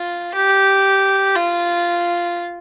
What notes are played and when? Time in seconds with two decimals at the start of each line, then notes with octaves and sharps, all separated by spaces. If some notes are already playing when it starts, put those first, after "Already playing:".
Already playing: F4
0.34 G4
1.35 F4